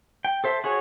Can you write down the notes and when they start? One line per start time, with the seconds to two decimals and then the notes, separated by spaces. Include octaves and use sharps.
0.25 G5
0.44 A4 C5 E5
0.64 F#4 G#4 C#5 G#5